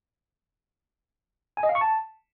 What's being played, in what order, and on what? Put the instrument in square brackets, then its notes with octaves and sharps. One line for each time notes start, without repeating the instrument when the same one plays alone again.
[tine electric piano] G#5
D#5
F5
C#6
A5